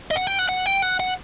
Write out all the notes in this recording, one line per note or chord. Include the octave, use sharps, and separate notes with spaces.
D#5
F#5
G5
F#5
F#5
G5
F#5
F#5